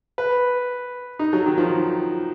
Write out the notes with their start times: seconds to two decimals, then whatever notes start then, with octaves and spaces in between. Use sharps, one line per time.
0.18 B4
1.19 D#4
1.33 F#3
1.46 D#3
1.58 F3